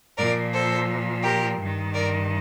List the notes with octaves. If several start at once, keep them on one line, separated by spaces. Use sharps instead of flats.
A#2 F3 A#4 D5
A4 C5
G4 A#4
G2 D#3
A#4 D5